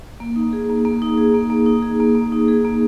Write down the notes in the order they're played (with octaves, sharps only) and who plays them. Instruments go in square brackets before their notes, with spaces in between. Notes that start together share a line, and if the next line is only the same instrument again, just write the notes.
[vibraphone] A#3
D#4
G#4
A#3
A#3
D#4
G#4
A#3
A#3
D#4
G#4
A#3
A#3
D#4
G#4
A#3